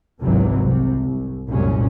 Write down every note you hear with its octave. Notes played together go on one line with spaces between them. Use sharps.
G#1 C#2 G#2 C3 E3 F#3
C2 C3
C2
C2 F#2 A#2 G#3 C#4